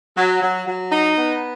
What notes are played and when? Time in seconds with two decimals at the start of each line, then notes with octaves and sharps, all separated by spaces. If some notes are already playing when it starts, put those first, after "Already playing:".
0.17 F#3
0.42 F#3
0.67 F#3
0.92 D#4
1.17 B3